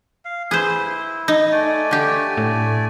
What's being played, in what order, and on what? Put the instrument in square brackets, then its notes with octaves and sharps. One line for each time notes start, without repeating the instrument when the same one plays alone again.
[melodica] F5
[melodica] E4 [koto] G#4 B4 C5
[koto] D#4
[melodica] A3 D5 G#5
[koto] D3 G4
[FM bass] A2